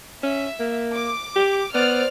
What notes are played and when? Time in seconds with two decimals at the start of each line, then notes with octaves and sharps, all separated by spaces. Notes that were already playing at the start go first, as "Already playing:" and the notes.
0.23 C#4 E5
0.60 A#3
0.95 D6
1.36 G4
1.75 B3 C5 D5 F6